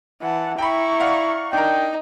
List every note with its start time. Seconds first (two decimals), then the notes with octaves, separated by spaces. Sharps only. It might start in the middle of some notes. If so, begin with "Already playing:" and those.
0.22 E3 F#5 A5
0.58 E4 G5 A#5 B5 C#6
1.00 D5 F5 F#5
1.53 D4 D#4 A#4 G5